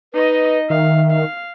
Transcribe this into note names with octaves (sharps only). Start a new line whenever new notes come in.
D#4 B4 D#5
D#3 E5 F5
F5